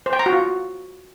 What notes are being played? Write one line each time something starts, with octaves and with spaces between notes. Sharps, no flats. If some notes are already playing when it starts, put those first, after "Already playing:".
C5
G5
A#5
F#4
F4